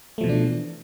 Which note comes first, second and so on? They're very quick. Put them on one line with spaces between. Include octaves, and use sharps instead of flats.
A3 F3 B2 E3 D4